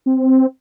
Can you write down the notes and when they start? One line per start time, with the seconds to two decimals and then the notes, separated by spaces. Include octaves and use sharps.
0.06 C4